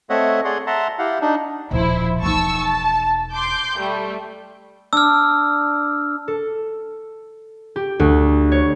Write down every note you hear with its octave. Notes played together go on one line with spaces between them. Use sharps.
A3 C4 C#5 D#5 E5 F#5
G#4 C#5 D5 F#5 C6
E5 F#5 A5 A#5 C6
E4 G4 F5 F#5
D4 D#4
D#1 B1 F3 E4 C5
E1 D#4 A5 C#6 E6
A5
C6 D6 G6
G3 A3
D4 E6 F6
A4
G4
D2
C#5